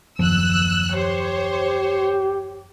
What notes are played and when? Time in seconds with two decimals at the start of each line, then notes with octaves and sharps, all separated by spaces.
0.19 F#1 D#2 F3 E6 F#6
0.94 G4 C5 C#5